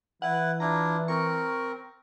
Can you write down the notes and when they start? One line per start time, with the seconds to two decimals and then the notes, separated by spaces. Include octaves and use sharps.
0.22 E3 E4 B4 F#5
0.60 D4 E4 F4 A#5
1.08 C4 A#4 C#6